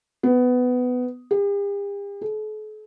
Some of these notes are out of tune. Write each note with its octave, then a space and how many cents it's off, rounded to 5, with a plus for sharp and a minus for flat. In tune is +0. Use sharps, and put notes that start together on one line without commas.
B3 +15
G4 +45
A4 -45